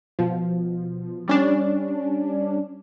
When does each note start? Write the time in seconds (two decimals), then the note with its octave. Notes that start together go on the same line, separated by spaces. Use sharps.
0.19 B2 F3
1.28 G3 C#4 D4